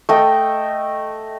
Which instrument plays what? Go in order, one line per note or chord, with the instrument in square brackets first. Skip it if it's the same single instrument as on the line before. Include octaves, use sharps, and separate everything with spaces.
[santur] A3 D#5 G5